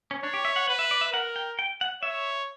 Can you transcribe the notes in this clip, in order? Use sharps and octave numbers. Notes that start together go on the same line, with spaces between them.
C#4
D4 C#5
G4
E5
F#5
B4 F#5
E5
D5
E5
A#4 F#5
G5
G5
F#5
C#5 E5